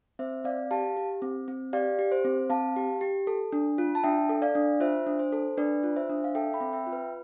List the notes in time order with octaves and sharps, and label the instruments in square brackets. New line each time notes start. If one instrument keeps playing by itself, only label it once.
[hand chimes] C4 C5 E5
C4 D5 F5
G4 F5 A5
G4
C4
C4
G4 D5 F5
G4
C5
C4
C4 F5 A5
G4
G4
A4
D4
F4
A5
D4 E5 G5
A4
D5 F5
D4
F4 C5 E5
D4
C5
A4
D4 B4 D5
F4
C5 E5
D4
F5
A4 E5 G5
G5 B5
C4
E5 G5
F4
B4